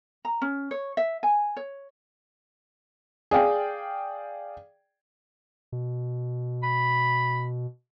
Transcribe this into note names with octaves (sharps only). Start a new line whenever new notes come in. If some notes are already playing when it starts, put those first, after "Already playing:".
A#5
C#4
C#5
E5
G#5
C#5
G#4 D5 F5 G5
B2
B5